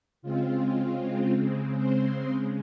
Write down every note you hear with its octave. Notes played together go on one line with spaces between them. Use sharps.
C#3 G#3 C4 F4
C4 C5